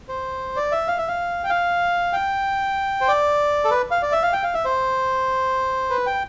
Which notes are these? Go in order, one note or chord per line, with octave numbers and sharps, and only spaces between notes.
C5
D5
E5
F5
E5
F5
G5
F5
G5
C5
D5
A4
B4
F5
D5
E5
F5
G5
F5
E5
C5
B4
G5